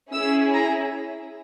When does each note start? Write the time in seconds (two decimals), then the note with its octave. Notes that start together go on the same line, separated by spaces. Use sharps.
0.13 C#4 E4 G#4 E6
0.54 A#5